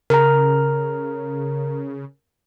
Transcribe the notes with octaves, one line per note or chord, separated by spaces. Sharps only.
C#3 A#4 A#5